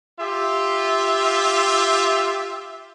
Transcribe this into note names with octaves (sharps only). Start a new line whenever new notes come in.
F4 G4 E5